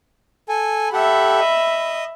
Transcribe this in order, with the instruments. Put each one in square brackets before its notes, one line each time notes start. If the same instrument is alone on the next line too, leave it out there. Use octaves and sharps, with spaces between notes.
[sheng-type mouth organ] A4 G#5
[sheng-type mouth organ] G4 A4 F#5 [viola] E5 B5
[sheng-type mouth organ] D#5